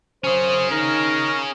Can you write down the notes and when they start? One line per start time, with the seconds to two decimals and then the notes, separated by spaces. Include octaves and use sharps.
0.24 F#2 F#3 C#4 G#4 C5
0.71 D#3 D#4 A#4